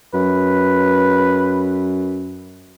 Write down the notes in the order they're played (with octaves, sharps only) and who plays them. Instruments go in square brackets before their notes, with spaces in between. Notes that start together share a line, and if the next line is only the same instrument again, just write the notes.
[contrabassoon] F#2 [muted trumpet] B4